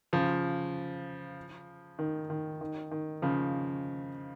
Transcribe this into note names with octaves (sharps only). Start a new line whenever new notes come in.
C#3 F3
D#3
D#3
D#3
D#3
C#3 F3